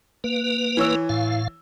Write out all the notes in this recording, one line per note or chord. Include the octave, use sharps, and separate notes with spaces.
A#3 B4
E3 C#5 E6
A2 F5